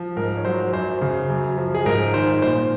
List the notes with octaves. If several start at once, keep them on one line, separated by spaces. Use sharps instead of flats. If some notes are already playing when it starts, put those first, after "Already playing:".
Already playing: F3
G#2 A#4
C#5
F#3 C5
F#2 C5
C#3
F#2
F3
G#4
G#2 A#4
D#3 C5
A#2 C5